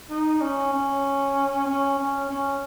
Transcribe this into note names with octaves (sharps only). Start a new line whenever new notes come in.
D#4
C#4
C#4
C#4
C#4
C#4